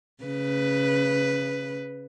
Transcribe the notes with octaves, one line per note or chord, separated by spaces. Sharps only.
C#3 B4